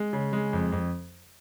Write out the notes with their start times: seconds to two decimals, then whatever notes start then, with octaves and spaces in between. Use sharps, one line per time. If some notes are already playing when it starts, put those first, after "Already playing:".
Already playing: G#3
0.13 C#3
0.33 G#3
0.53 F2
0.72 F2